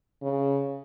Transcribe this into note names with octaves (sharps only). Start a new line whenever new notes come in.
C#3